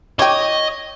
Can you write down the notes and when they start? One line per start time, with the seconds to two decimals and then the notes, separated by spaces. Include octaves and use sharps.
0.19 E3 G4 C#5 D#5